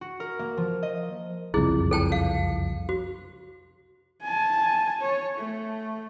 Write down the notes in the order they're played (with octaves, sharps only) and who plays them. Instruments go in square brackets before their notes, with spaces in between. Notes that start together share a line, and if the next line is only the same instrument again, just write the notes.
[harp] F#4
A#4
A#3
F3
D#5
[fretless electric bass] F#1 C2 F2 [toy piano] E4 G#4
[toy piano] A4 G5 A5
F5
F#4
[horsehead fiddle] G#5 A5
C#5
A3